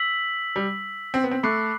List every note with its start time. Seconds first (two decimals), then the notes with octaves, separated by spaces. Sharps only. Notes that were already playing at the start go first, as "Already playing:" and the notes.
Already playing: E6 B6 F#7
0.56 G3
1.14 C4
1.24 B3
1.31 C4
1.43 A3 B5 D6 F#6 C7